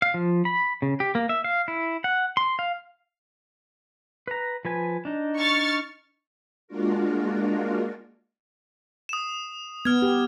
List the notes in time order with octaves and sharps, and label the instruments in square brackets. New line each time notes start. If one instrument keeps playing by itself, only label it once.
[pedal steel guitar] F5
F3
B5
C#3
G4
A#3
E5
F5
E4
F#5
C6
F5
B4 A#5
F3 B4 G#5
D4 D#4
[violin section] C#6 F6 A6
[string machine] G#3 A#3 D4 F4 F#4 A#4
[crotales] D#6 E7
[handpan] B3 [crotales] F6 G#6
[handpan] G4